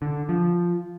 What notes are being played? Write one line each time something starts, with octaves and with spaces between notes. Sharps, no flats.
D3
F3